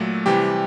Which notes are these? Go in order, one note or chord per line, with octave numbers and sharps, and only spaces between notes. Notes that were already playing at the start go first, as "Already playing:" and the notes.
Already playing: A#2 F#3 A3 A4
C3 E3 G3 G4